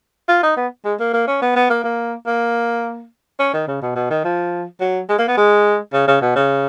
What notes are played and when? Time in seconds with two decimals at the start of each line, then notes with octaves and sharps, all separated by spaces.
0.28 F4
0.43 D#4
0.57 B3
0.85 G#3
1.00 A#3
1.13 A#3
1.27 C#4
1.42 B3
1.56 B3
1.70 A#3
1.84 A#3
2.27 A#3
3.39 C#4
3.53 D#3
3.68 C#3
3.82 B2
3.95 B2
4.10 D#3
4.24 F3
4.81 F#3
5.09 G#3
5.18 A#3
5.28 B3
5.37 G#3
5.93 C#3
6.07 C#3
6.21 B2
6.36 C#3